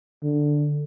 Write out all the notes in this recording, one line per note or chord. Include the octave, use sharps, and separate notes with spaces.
D3